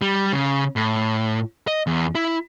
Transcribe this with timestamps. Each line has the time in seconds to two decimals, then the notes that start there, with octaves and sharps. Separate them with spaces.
0.02 G3
0.33 C#3
0.76 A2
1.67 D#5
1.87 E2
2.15 E4